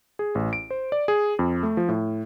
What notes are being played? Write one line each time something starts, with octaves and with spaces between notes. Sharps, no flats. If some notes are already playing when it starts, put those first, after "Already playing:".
G#4
A1
D7
C5
D5
G#4
F2
A3
F3
A2